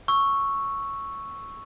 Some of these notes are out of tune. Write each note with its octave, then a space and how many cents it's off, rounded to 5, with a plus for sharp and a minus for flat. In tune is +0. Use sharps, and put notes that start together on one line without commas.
C#6 +0 E6 +0